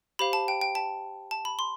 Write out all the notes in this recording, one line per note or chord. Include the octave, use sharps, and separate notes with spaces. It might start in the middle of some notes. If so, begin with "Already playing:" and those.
G4 C5 F5 B5
A5
G5
G5
A5
A5
B5
C6